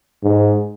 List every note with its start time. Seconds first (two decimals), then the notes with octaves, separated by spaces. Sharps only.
0.23 G#2